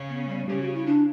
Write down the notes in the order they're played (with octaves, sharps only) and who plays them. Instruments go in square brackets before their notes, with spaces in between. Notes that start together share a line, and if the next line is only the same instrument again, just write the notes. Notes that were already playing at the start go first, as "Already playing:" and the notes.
Already playing: [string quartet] C#3 C#4
[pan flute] B3
G3
[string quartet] C#3 C#4 [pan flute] G4
[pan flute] F#4
E4
D4